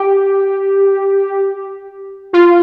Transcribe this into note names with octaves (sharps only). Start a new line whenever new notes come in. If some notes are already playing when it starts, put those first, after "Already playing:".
Already playing: G4
F4